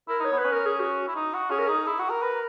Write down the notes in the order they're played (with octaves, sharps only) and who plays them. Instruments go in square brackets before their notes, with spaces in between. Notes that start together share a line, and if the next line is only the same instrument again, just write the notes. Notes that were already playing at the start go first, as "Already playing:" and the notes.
[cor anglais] E4 [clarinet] A#4
[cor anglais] D#4 [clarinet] C#5
[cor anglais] B3
[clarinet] B4
[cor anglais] C#4
[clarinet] A#4
G#4
F#4
[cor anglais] E4
D#4
F#4
[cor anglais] C#4 [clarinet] G#4
[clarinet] A#4
[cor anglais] D#4 [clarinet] G#4
[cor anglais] E4
F#4
A#4
[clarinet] A#4 [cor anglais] B4